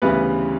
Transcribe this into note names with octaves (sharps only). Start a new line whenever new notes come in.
D2 C#3 E3 G3 B3 B4